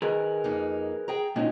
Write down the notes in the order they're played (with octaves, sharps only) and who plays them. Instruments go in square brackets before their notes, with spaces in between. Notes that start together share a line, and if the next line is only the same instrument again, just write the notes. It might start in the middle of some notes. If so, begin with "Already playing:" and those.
[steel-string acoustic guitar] D#3 [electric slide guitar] G#4 A#4 B4
[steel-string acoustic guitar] F2 A#3 D#4
G#4 G5 A#5
[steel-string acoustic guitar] D2 G#3 [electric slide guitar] A#2 C#4 D#4